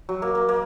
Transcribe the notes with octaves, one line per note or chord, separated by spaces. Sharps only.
F#3
A#3
A#3
A#3